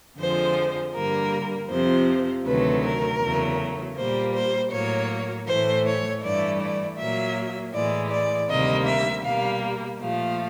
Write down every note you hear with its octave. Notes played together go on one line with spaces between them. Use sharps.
F2 D3 F3 G#3 C5
G2 D3 G3 A#3 A#4
F2 C3 F3 C5
D2 C3 D#3 F#3 A3 B4
A#4
E2 C#3 F#3 A3
A#2 G3 A#3 C5
C5
A2 F#3 A#3 C#5
A2 E3 A3 C5
C#5
G2 E3 A3 D5
D5
A#2 F#3 A#3 E5
A2 E3 G#3 D5
D5
D2 C3 D#3 G3 A#3 D#5
E5
B2 G3 A#3 F5
A#2 F3 A3 F5